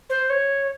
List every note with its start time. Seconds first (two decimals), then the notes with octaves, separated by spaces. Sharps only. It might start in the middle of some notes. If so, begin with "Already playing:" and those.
0.09 C5
0.30 C#5